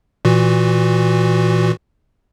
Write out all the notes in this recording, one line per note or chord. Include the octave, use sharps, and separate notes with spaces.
A#2 E3 F#4